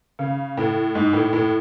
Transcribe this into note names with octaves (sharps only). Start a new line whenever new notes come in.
C#3
A2
G#2
A2
A2